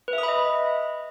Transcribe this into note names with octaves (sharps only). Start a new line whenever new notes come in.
B4
E5
D#6
B5
D#5